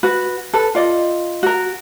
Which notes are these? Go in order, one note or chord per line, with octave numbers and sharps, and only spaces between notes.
F#4 B4
A4 B4
F4 D5 D#5
F#4 A#4